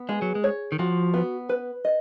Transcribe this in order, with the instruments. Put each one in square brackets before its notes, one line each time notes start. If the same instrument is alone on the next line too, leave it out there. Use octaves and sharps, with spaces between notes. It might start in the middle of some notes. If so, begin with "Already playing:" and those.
Already playing: [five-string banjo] B3
[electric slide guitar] G#3 [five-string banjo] G#4
[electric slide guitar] F#3
G#3
[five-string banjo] C#5
[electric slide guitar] D#3
[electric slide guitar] F3 [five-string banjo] F#4
[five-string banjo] B3
B4
D#5